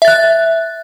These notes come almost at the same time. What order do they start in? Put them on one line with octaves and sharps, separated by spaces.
E5 A6 F#6